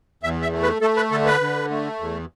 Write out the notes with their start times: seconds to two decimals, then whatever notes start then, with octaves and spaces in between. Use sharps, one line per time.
0.23 E2 E5
0.42 E5
0.53 A3
0.63 B4
0.81 A3 A4
0.96 B4
1.11 D3 A4
1.26 B4
1.41 D3
1.70 A3
2.00 E2